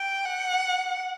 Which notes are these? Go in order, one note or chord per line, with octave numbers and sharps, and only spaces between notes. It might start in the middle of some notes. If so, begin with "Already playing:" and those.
Already playing: G5
F#5